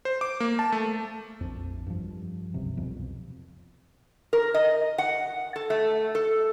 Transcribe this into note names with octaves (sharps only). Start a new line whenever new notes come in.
C5
D6
A#3
A5
A3
A#1 F2
G2 F3
F#1 C#2 F#2 C3
C2 F2 B2
A#4
D#5
F#5
A4
A3
A4